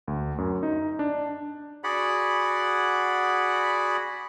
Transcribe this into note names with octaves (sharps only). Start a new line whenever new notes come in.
D2
F#2
D#4
D4
F#4 G#4 D5 F#5 B5